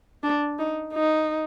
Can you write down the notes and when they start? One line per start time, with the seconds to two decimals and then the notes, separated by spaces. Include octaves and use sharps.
0.23 D4
0.59 D#4
0.94 D#4